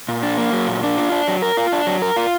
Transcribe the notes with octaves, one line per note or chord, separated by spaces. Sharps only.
A#2
D4
A#3
F#3
A#2
D4
F4
D4
F#3
A#4
F4
D4
F#3
A#4
F4